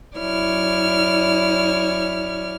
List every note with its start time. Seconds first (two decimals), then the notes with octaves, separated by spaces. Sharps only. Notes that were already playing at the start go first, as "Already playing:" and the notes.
0.18 F#2 E4 C#5 D5 F6